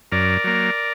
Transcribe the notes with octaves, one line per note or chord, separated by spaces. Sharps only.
F#2 A#4 D5
F#3 A#3